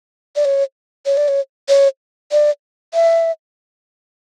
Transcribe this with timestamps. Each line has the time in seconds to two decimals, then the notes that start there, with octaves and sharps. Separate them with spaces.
0.36 D5
0.45 C#5
1.06 C#5
1.17 D5
1.28 C#5
1.69 C#5
2.32 D5
2.94 E5